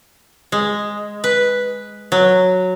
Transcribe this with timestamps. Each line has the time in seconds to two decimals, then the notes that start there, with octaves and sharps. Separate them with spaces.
0.52 G#3
1.24 B4
2.12 F#3